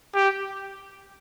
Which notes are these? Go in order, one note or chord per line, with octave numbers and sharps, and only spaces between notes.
G4